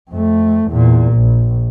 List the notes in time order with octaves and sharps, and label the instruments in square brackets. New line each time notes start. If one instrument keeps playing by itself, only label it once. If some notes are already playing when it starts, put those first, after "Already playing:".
[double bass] F2 A3
E2 A#2
A#1